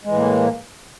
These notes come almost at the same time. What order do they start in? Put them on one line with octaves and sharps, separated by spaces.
G#3 E3 A2 A#3